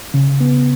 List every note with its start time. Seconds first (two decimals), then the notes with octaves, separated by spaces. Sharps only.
0.14 C#3
0.41 B3